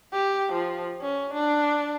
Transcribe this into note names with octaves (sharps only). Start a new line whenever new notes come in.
G4
F3
C#4
D4